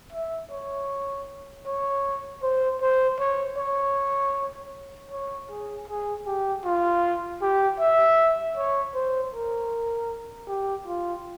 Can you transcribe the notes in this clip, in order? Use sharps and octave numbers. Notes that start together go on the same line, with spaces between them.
E5
C#5
C#5
C5
C5
C#5
C#5
C#5
G#4
G#4
G4
F4
G4
E5
C#5
C5
A#4
G4
F4